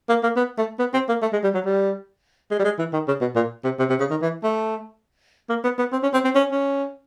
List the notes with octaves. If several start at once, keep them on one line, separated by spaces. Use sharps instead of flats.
A#3
A#3
B3
A3
B3
C4
A#3
A3
G#3
G3
F#3
G3
G#3
G3
G#3
E3
D#3
C#3
B2
A#2
C3
C3
C3
C#3
D#3
E3
A3
A#3
B3
B3
C4
C#4
C4
C4
C#4
C#4